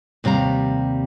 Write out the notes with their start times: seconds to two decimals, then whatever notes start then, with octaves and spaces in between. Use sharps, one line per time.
0.24 D#2 C3 G3 F5 A#5